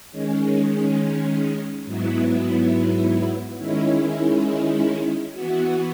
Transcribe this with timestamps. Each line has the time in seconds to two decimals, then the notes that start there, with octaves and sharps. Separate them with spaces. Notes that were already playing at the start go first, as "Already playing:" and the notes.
0.11 D#3 G#3 C#4
1.85 G#2 F#3 B3 E4
3.58 D#3 G#3 C#4 E4
5.32 E3 B3 F#4